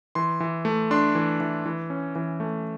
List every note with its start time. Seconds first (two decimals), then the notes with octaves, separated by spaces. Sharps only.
0.15 E3 C6
0.40 E3
0.65 A3
0.91 D4 C6
1.15 E3
1.40 E3
1.66 E3
1.90 C#4
2.15 E3
2.40 A3